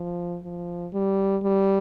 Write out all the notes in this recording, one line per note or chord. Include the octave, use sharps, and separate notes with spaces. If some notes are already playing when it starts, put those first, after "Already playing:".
Already playing: F3
F3
G3
G3